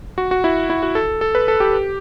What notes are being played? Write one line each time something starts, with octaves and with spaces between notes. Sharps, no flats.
F#4
F#4
E4
E4
F#4
A4
A4
B4
A4
G4